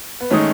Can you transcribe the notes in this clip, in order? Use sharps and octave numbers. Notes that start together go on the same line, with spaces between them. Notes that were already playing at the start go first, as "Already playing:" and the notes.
B3
D#3 G#3 A3 C#4 D#4